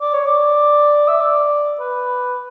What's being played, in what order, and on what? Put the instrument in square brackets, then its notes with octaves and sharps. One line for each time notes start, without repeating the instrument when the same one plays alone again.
[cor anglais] D5
C#5
D5
E5
D5
B4